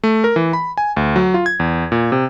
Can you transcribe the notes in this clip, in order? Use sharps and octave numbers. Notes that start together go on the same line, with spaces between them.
A3
A#4
E3
B5
G#5
D2
F#3
F4
G#6
E2
A#2
C3